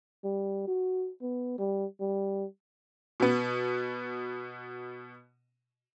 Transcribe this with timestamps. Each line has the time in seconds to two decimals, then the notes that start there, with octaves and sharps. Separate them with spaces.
0.24 G3
0.68 F#4
1.22 B3
1.59 G3
2.00 G3
3.20 B2 B3